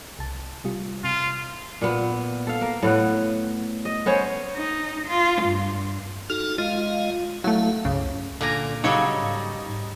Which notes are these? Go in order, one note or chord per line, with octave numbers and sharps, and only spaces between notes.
C2 A5
C3 G3 F4
C3 F4
A#2 B3
A4 F5
A#3
A2 B3 F#5
D#5
B3 C#4 C5 C#5
D#4
F4
G2
D#4 F#4 A4 F6
G#3 F4 D#5 F5
F#3 A3 E4 F5
C#2 G2 C#3
A#2 D3 G#5 A#5
C#3 F#3 G3 D#4 A4 C#5 F5
G#2